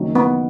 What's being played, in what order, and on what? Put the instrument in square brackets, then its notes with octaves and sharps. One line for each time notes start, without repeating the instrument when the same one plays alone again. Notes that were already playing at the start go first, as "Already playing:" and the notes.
Already playing: [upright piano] F#1 F#2 D#3 F#3
[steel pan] B3